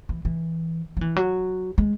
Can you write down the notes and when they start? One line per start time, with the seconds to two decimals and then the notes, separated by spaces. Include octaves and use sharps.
0.09 E3
0.25 E3
0.97 F#3
1.01 E3
1.16 F#3
1.78 G#3